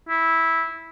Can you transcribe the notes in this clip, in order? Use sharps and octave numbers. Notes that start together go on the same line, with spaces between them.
E4